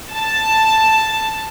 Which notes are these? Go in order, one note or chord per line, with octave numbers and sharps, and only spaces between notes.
A5